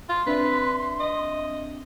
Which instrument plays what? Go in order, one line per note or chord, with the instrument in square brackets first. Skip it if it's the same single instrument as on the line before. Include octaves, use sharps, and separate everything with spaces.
[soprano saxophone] F4 [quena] C6
[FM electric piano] C4 D4 E5 [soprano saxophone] B4
[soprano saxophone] D#5